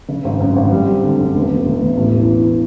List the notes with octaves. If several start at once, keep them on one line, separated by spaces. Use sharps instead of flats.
C#3
G#1
F#2
G#1
G3
C4
D3
F#2
E1
E1
E1
E1
A1
E3
E3
E3